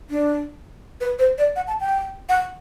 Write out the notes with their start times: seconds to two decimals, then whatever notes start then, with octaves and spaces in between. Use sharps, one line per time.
0.10 D4
1.01 B4
1.19 C5
1.38 D5
1.56 F#5
1.68 A5
1.81 G5
2.29 F#5